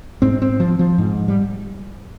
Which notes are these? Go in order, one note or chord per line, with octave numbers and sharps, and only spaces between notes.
G#2 C4
C4
F3
F3
G#2
G3